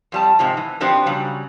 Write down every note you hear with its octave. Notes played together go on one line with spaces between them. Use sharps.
F2 G3 A5
G#2 C3 F3
E3
B2 F3 B3 C4 D4 G4
C#3 F#3 G3